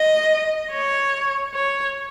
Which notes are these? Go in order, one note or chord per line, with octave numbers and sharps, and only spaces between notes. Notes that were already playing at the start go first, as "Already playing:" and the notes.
Already playing: D#5
C#5
C#5